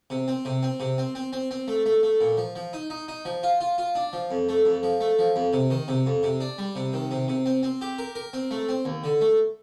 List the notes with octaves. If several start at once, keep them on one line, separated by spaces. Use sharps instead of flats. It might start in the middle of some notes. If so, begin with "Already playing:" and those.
C3
C4
C3
C4
C3
C4
C4
C4
C4
A3
A3
A3
A#2
F3
F3
D#4
D#4
D#4
F3
F4
F4
F4
D4
F3
F2
A3
F2
F3
A3
F3
F2
C3
D#3
C3
F2
C3
D4
G3
C3
D#3
C3
C3
C4
C4
G4
A#4
A#4
C4
A3
C4
D#2
D3
A3